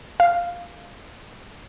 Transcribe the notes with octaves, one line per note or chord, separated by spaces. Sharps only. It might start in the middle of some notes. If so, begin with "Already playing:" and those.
F5